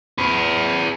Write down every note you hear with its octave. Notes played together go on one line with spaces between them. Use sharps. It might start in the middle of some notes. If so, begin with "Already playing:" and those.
G#4 B4